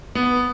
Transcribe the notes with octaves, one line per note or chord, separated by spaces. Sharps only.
B3